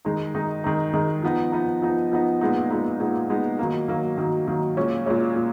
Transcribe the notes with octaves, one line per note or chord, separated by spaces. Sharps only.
D#3 G#3 D#4
D#3 G#3 D#4
D#3 G#3 D#4
D#3 G#3 D#4
F3 B3 D#4
F3 B3 D#4
F3 B3 D#4
F3 B3 D#4
A#2 G#3 B3 D#4
A#2 G#3 B3 D#4
A#2 G#3 B3 D#4
A#2 G#3 B3 D#4
D#3 F#3 A#3
D#3 F#3 A#3
D#3 F#3 A#3
D#3 F#3 A#3
A#2 G#3 C#4
A#2 G#3 C#4
A#2